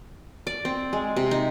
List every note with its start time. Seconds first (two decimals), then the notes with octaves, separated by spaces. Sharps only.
0.47 D5
0.65 C4
0.93 G#3
1.16 C3
1.31 D#4